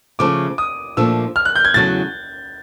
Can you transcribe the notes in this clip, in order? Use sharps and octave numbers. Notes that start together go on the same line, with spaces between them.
C#3 F3 A3 D6
D#6
A#2 F3 A3 D4 E6
F6
F#6
G6
G#6
E2 C#3 F#3 A3 A6